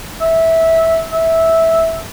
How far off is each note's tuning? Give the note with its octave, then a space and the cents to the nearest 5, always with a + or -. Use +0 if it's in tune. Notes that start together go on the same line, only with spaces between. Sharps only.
E5 -15
E5 -10